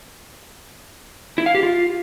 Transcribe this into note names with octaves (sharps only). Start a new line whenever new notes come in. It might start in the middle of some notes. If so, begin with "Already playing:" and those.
E4
F5
G4
F4